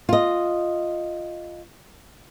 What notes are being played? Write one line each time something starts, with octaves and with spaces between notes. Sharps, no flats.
F4 D#5